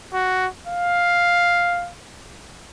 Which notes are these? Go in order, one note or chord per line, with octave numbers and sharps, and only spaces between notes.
F#4
F5